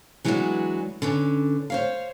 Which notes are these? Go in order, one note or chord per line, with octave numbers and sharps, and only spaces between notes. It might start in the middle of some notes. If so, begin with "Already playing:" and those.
E3 F#3 G#3 B3 D4 F#4
D3 C#4 B4
C5 C#5 F5